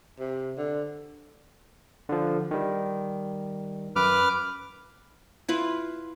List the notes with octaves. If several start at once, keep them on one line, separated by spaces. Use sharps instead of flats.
C3
D3
D3 F3
D#3 G3
F#2 B4 D6 F6
E4 F4 B4